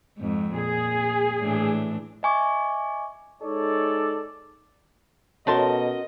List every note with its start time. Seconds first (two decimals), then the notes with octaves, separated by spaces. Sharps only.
0.18 F2 G#2
0.54 A#2 G#4
1.40 A2 E3 D4
2.23 D#5 E5 G#5 C#6 D6
3.43 G#3 D#4 A4 C#5 D5
5.47 B2 A3 C#4 F#4 A#4 D#5 A5 C6